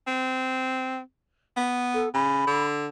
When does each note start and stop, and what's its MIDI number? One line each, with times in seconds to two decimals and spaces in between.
0.07 0.99 60
1.57 2.07 59
1.94 2.09 69
2.14 2.46 49
2.14 2.64 83
2.47 2.87 50